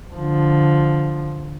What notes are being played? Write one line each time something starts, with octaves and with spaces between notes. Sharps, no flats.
D3 F3